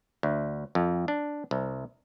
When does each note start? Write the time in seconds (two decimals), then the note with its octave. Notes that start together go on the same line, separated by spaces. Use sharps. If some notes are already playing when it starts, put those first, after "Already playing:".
0.23 D2
0.75 F2
1.08 D4
1.51 C2